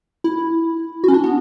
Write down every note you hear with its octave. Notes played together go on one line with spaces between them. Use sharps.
E4
F#4
C#4
D4
B3